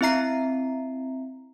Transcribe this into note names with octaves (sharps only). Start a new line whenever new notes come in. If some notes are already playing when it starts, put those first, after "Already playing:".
C4 E4 E5 A#5 C7